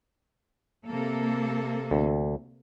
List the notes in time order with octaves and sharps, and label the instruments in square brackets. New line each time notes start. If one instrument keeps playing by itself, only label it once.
[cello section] C3 A#3 A4
[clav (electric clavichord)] D2